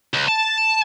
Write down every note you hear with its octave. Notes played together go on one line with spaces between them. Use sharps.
C#2
A5